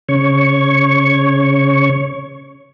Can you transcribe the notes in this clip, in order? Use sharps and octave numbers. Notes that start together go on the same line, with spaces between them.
C#3 C#5 C#6